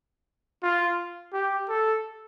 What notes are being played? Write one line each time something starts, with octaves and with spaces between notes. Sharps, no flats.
F4
G4
A4